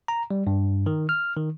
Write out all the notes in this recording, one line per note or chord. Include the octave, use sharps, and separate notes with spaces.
A#5
G3
G2
D#3
F6
D#3